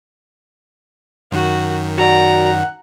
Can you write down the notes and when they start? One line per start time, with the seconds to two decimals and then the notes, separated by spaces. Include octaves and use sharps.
1.32 F#2 D#3 F#4
1.98 F#4 D5 F#5 A#5